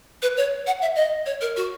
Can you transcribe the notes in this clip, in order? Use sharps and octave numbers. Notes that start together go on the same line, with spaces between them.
B4
C#5
F#5
E5
D#5
C#5
A#4
F#4